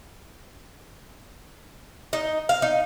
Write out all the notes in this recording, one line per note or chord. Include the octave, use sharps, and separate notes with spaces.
D#4
F5
D#4